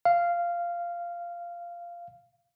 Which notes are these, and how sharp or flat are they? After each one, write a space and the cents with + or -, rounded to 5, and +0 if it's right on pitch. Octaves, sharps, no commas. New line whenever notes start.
F5 -10